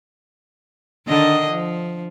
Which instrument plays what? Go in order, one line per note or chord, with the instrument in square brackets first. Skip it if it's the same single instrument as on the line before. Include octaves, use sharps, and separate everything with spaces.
[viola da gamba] D3 D#3 D#5
F3